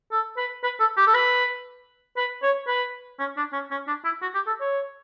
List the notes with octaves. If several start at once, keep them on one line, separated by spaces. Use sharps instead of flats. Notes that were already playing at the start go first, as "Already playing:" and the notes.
A4
B4
B4
A4
G4
A4
B4
B4
C#5
B4
C#4
D4
C#4
C#4
D4
E4
F#4
G4
A4
C#5